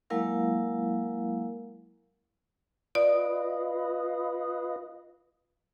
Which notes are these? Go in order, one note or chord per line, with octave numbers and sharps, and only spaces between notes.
F#3 G#3 A#3 E4 A#4 F5
F4 B4 D5 D#5